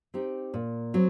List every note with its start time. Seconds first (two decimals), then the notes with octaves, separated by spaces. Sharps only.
0.14 C4 D#4 G4
0.54 A#2
0.94 F#3 C4